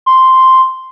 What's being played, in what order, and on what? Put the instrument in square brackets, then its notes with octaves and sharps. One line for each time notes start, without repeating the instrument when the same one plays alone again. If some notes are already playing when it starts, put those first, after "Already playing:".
[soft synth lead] C6